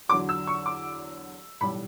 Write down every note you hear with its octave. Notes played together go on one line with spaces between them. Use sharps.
E2 D3 F#3 D6
E6
C#6
D6
B1 A2 E3 G3 B5